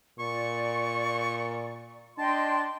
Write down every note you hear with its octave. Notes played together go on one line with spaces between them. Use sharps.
A#2 D5 C#6
D4 D#5 G5 A5 C6